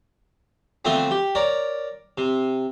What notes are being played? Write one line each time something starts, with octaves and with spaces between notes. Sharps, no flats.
D3 E3 F3 A3 B3 C4
G4
A#4 C#5 D5
C3